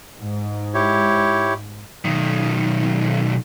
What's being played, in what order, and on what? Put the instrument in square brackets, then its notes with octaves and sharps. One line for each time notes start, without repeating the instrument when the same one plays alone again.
[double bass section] G#2
[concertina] E4 G4 C#5
[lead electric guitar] B1 D#3